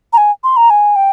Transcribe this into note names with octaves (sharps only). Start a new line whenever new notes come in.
A#5
G#5
C6
A#5
G#5
G5